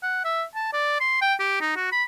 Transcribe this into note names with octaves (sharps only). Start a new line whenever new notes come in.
F#5
E5
A5
D5
C6
G5
G4
D#4
F#4
B5